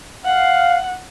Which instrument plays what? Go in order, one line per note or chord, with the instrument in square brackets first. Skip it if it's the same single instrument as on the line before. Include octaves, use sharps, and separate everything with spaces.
[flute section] F5 [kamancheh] F#5